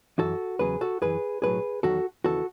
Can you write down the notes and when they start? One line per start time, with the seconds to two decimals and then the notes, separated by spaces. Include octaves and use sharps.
0.19 F#2 E3 F#4 A4
0.59 E2 C#3 F#3 G#4 B4
0.81 F#4 A4
1.02 F#2 E3 G#4 B4
1.42 B1 A2 F#3 G#4 B4
1.83 E2 D#3 F#3 F#4 A4
2.24 D#2 C#3 E3 F#4 A4